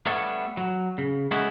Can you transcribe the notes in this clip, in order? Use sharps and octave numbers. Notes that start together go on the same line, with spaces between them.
G3 A3 B3 D4 A4 C#5
F#3
C#3
G#3 A3 B3 C#4 E4 F#4